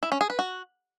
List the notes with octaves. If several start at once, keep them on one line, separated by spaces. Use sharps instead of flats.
E4
C#4
G#4
B4
F#4